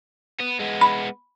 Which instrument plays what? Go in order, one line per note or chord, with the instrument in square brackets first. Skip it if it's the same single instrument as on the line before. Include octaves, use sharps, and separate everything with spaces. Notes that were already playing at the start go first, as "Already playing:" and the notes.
[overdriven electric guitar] B3
G#3 B3
[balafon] B5